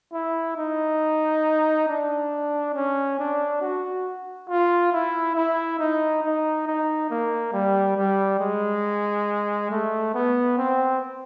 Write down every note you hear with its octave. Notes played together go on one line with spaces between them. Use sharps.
E4
D#4
D4
C#4
D4
F#4
F4
E4
E4
D#4
D#4
D#4
A#3
G3
G3
G#3
A3
B3
C4